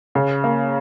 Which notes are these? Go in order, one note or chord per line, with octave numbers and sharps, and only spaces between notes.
C#3
A#3